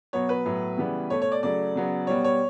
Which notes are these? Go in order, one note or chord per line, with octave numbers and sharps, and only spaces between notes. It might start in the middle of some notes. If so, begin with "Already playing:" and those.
B2 F#3 B3 C#5
B4
A2 F#3 B3
C#3 E3 G3 B3
B2 A3 C#5
C#5
D5
C#3 F#3 A3 D5
C#3 F#3 B3
B2 G3 B3 C#5
C#5